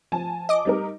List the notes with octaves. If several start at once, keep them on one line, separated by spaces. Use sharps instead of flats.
F3 G#5 A5
D#5 D6
G3 D#4 A#4